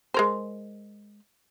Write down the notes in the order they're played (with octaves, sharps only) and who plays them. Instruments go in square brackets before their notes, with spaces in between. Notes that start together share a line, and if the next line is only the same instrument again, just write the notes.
[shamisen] G#3 A#4 C5